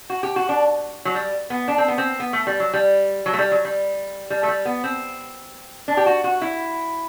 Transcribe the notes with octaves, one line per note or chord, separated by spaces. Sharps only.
F#4
G4
F#4
D4
F#3
G3
B3
D4
C4
B3
C4
B3
A3
G3
F#3
G3
F#3
A3
G3
F#3
G3
G3
A3
G3
B3
C4
D4
G4
F#4
F#4
E4